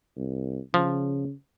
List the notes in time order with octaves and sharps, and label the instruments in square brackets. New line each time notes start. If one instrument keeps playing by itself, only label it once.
[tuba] C2
[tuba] C#3 [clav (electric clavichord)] F3